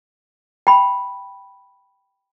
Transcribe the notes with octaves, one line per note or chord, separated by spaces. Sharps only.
G5 B5